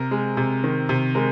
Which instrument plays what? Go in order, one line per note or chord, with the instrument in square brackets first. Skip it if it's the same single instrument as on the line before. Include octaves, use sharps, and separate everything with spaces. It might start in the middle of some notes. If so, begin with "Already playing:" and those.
Already playing: [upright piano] C3 A#4
G#3
C3
D#3
C3
G#3 A#4